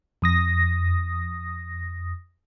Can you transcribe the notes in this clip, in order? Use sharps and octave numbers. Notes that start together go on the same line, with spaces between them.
F2 D#6 A#6